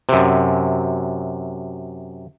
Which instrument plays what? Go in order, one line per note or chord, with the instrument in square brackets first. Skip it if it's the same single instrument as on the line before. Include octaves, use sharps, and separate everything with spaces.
[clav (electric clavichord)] F#2 C3